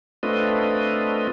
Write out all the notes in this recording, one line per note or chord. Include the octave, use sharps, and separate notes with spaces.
A3 C4 D4 F4 B4 D#5